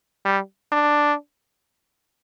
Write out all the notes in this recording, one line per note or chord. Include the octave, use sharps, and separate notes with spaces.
G3
D4